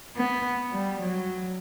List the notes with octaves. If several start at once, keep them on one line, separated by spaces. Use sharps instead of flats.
B3
G3
F#3